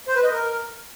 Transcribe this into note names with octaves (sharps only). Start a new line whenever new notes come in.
C5
B4
D#5
A#4